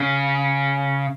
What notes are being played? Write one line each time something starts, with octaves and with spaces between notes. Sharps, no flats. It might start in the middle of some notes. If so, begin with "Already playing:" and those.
Already playing: C#3